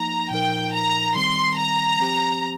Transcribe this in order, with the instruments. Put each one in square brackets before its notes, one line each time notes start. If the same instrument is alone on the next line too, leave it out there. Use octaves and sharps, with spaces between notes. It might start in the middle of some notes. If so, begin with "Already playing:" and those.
Already playing: [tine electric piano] F3 A#3 D#4 [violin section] A#5
[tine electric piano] A#2 F3 D#4 A#4 [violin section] G5
[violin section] A#5
[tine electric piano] D#3 G3 C4 [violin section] C6
[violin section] A#5
[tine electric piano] F3 C4 G4